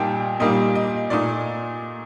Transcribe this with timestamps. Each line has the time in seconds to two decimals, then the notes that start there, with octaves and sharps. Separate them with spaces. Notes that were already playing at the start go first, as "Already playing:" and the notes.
Already playing: A#2 G3 A#3 D#4 G5 A5
0.40 A#2 G3 A#3 D#4 D#5
0.75 D#5
1.10 A#2 A3 D#4 D5